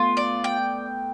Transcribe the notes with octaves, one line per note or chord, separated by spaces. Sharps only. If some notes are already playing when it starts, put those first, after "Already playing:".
Already playing: A3 B3 F4
D5
G5